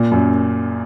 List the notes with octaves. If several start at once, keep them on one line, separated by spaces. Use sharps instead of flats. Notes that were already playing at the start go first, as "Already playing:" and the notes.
Already playing: A#2
F#2